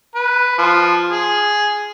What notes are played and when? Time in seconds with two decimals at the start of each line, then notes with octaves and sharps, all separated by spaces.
0.15 B4
0.58 F3
1.10 G#4